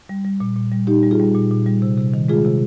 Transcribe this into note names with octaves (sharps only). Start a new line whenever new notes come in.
G3
G3
A#2
A#2
G3
A#2 D#4 G4
G3
F4 G#4
G3
A#2
A#2
G3
C3
C3
D#3
G#3 F4 G#4
C3